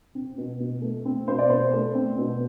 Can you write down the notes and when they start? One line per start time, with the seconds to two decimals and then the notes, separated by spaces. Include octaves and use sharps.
0.15 C4
0.38 B2
0.60 B2
0.82 A3
1.05 C4
1.28 B2 C5
1.39 D5
1.49 B2 C5
1.73 A3
1.95 C4
2.18 B2